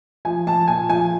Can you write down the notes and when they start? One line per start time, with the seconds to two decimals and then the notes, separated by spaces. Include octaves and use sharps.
0.25 F3 G#5
0.47 F3 A5
0.68 A#2 G#5
0.89 F3 G#5